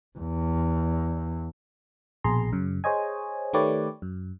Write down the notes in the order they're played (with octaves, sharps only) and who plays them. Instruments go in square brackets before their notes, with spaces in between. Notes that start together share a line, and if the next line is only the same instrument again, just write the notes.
[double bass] E2
[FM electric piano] A#1 B2 G#4 A#5 C6
F#2 C#3
G#4 C5 C#5 D#5 G#5
D#3 A3 G4 B4 C#5 D5
F#2